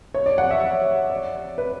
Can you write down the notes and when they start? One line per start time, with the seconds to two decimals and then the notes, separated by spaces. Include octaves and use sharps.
0.14 C#5
0.26 D5
0.38 F#5
0.51 E5
1.10 D5
1.58 B4